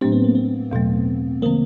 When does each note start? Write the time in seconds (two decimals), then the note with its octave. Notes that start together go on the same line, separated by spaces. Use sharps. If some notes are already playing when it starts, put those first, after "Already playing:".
0.01 A2 F#3 A3 C4 D4 G4
0.12 B3
0.24 A#3
0.35 B3
0.71 E2 B2 F#3 A3
1.42 D3 F3 A3 A#3 C4